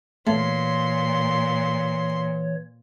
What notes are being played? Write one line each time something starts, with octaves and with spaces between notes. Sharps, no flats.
A#2 E3 A3 C#5 C6